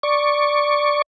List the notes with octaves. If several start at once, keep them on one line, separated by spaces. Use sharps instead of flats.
D5 C#6